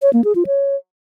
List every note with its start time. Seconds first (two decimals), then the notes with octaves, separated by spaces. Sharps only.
0.02 C#5
0.13 A#3
0.24 G#4
0.35 F4
0.46 C#5